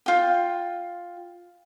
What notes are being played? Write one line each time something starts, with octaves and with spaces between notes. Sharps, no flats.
F4 G5